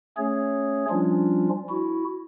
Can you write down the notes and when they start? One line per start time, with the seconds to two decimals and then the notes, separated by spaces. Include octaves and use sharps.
0.17 A3 C#4 G#4 C#5
0.90 F3 G3 C#4 D4 F4
1.69 E4 F#4